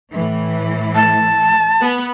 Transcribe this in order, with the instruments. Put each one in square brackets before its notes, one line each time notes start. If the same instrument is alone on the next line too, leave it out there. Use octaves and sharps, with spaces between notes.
[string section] A2 E3
[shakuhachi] A5
[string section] B3 B5